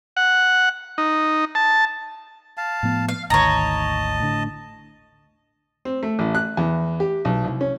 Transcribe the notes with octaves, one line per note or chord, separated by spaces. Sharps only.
F#5
D#4
A5
F5 A5
A2 F3 B3
F5
G#1 D2 D#3 C#5 D#5 A5 A#5
A2 D3
C4
A3
A1
F#6
E2
G4
B1
C2
C#4